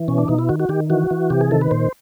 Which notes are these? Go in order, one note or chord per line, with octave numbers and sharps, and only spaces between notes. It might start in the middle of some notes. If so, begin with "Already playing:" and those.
Already playing: E3
B2 C#4
D4
B2 D#4
E4
D#3 F#4
F#4
D#3 G4
E3 F#4
E3
C3 G4
G#4
D#3 A4
B4
A#2 C5